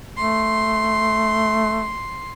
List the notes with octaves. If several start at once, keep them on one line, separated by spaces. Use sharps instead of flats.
A3 C6